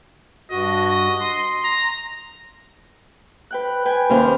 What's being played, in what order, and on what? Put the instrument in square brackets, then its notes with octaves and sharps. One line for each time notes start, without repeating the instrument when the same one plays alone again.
[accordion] G2 F#4 [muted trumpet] D#5
[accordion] C6
[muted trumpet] A#5
[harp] B4 G5 F#6
B4 G5 G#5
D#2 C3 C#4 C5 F5